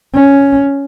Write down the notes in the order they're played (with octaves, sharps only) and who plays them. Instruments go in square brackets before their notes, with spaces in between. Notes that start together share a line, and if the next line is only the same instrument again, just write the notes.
[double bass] C#4